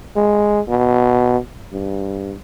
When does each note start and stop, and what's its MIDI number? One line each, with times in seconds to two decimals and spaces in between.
0.16 0.60 56
0.68 1.37 47
1.73 2.33 43